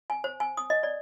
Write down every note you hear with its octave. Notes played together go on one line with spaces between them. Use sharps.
G#5
C5
G#5
D#6
D#5
D5